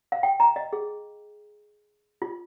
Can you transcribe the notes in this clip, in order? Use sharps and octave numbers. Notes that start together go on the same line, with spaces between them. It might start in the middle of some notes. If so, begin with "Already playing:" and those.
F5
G5
A#5
D#5
G#4
F4